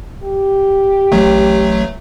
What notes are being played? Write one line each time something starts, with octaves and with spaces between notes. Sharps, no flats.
G4
A1 F#3 A3